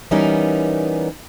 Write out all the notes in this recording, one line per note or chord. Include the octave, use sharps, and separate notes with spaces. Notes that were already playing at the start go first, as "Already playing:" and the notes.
E3 G3 B3 C#4 D#4 A#4